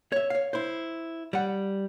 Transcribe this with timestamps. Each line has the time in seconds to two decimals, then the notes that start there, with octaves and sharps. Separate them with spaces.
0.12 C#5 E5
0.30 C#5 F5
0.53 E4 C5
1.33 G3 F#5